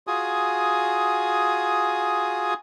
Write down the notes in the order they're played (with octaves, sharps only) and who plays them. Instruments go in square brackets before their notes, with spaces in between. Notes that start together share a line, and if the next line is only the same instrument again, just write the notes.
[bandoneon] F4 F#4 G#4 G#5 D#6